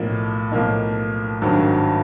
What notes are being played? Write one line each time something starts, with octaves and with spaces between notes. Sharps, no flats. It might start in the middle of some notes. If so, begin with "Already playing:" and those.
Already playing: B1 A2 F3 A#3 D#4
B1 A2 F3 A#3 D#4
G#1 G2 D#3 F#3